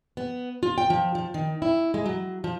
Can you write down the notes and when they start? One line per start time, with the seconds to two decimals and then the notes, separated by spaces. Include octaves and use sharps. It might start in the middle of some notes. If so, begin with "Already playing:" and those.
0.17 B3
0.63 F4
0.78 G5
0.90 F3
1.15 F3
1.34 D#3
1.62 E4
1.94 G#3
2.06 F#3
2.44 F3